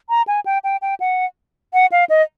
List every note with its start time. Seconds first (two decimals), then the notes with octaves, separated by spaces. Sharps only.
0.09 A#5
0.28 G#5
0.46 G5
0.64 G5
0.82 G5
1.00 F#5
1.73 F#5
1.92 F5
2.10 D#5